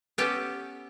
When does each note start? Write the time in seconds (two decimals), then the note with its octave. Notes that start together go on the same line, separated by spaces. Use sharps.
0.18 B3 C#4 G4 A4 B4